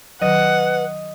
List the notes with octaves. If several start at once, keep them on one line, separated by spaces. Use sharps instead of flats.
D#3 F#3 B4 D#5 F#5